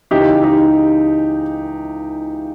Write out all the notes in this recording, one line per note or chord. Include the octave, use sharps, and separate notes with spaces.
C#2 C#3 E3 D#4 G4
D#4 G4